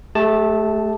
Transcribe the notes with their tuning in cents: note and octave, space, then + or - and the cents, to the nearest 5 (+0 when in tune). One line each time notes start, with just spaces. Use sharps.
A3 -15 G4 +25 A5 +0